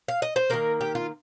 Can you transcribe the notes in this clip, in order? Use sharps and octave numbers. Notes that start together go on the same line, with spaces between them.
F5
D#5
C5
D#3 G3 A#3 A#4
G4
F4